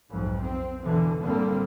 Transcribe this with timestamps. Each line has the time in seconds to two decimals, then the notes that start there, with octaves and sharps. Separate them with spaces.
0.11 B1 F2 G#2
0.44 C4
0.83 E2 B2 D3 E3 F3
1.22 A2 D3 G3 A#3 C4